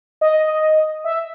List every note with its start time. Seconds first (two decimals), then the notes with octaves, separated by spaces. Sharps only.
0.21 D#5
1.04 E5